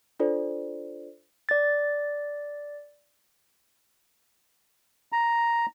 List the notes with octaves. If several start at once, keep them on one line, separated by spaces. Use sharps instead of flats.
D4 F4 A4 C5 D5
D5 A6
A#5